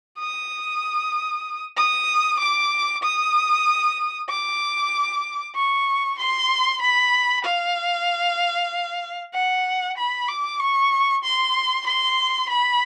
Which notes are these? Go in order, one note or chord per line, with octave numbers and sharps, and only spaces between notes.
D#6
D#6
D6
D#6
D6
C#6
C6
B5
F5
F#5
B5
D6
C#6
C6
C6
B5